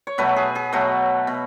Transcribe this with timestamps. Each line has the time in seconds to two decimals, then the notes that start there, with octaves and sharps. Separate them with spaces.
0.07 C#5
0.18 B2 F#3 A3 B4
0.36 G#4
0.55 G#4
0.73 B2 F#3 A3 F#4
1.27 B2